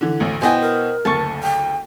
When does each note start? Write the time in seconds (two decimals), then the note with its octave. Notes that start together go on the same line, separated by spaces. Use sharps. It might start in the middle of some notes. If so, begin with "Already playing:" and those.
0.01 D3 E3
0.20 A1 D2
0.42 B2 B3 E4 C5 D#5 G5 G#5
0.61 A#4
1.05 F#1 D2 A4 A5 C#6
1.43 G5